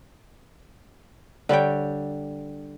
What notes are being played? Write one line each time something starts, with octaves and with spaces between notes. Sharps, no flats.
D3 G3 C#5 G5